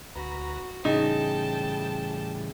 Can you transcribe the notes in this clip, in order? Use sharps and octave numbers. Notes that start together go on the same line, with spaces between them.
D2 F#4 B4 A#5
A2 C#3 E3 G3 D#4 G5 A5